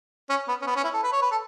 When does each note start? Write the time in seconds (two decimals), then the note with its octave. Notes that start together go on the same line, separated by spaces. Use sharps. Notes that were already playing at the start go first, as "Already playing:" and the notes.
0.29 C#4
0.48 B3
0.62 C#4
0.67 B3
0.76 C#4
0.84 E4
0.93 A4
1.03 B4
1.12 C#5
1.22 B4
1.31 A4